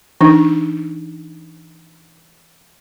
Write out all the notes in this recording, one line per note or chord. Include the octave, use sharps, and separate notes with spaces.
E3 D4 D#4